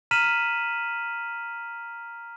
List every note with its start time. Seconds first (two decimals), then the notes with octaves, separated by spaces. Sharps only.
0.11 A#5 F6 B6 D#7 E7 F#7